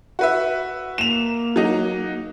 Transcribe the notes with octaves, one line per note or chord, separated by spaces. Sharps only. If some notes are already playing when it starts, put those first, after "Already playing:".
F#4 B4 E5
A#3 E7 F7
F#3 D#4